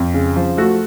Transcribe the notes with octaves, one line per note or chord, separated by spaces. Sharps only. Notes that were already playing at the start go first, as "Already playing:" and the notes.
Already playing: F2
C#3
F3
A3 F#4